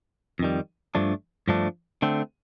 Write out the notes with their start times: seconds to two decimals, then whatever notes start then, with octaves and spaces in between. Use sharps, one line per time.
0.39 F2 D#3 G3
0.95 G2 F3 A3 D4
1.48 G2 F3 A3 D4
2.02 D3 A3 C4